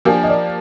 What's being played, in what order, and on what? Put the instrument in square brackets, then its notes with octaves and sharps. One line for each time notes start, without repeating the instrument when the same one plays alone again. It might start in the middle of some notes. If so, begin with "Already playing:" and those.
[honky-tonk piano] F3 A#3 D4 G4 [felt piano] G#5
[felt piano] D#5
D5